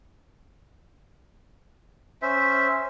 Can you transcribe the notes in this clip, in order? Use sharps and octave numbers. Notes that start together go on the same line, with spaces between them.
C#4 C5 E5